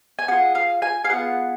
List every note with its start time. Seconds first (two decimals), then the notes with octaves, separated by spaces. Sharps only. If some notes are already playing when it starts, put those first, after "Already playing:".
0.19 G#5
0.28 B3 F4 G#4 F#5
0.55 F5
0.82 G#5
1.05 F5
1.09 B3 F4 G#4 F#5